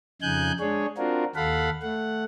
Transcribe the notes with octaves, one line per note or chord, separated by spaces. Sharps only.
F2 C#3 D#4 G#5 F#6 G6
G#3 D4 G#4 C#5
C4 D4 F4 F#4 A#4
D#2 A4 F5 F#5 B5
A3 F#5